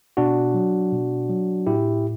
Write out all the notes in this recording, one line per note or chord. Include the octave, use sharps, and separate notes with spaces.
B2 D4 F#4
F#3
B2
F#3
A2 E4 G4